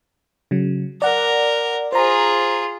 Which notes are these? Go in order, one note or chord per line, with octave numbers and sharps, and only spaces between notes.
C#3 F#3
A#4 D5 F#5
F4 G#4 C5 A#5